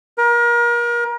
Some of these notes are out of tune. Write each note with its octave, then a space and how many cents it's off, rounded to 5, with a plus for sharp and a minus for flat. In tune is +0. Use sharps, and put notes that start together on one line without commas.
A#4 +35